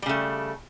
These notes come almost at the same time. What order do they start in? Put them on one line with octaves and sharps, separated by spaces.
G3 C#3 A3